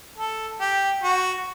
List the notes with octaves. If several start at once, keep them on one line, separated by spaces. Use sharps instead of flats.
A4
G4
F#4